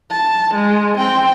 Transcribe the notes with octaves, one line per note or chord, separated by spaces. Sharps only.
A5
G#3
C4 G5